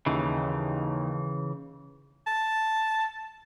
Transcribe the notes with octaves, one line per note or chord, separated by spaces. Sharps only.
D#2 C#3 E3 D#4
A5